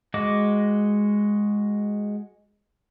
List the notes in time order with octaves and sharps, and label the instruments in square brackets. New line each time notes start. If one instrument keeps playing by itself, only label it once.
[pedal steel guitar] G#3 F#4 D#5 D6